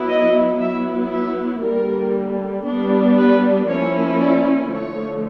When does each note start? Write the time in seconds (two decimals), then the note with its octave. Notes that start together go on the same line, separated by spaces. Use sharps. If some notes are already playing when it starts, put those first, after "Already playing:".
Already playing: F#3 B3 E4
0.09 D#5
0.60 F#3 B3 E4 E5
1.12 E5
1.63 D3 G3 A#3 A#4
2.65 G3 B3 D4
3.17 B4
3.68 F3 A#3 C#4 E4 C#5
4.20 D5
4.71 D3 F3 A3 C#5